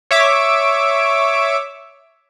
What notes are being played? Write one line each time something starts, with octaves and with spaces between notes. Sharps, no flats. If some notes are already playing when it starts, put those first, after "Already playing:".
C#5 E5 D6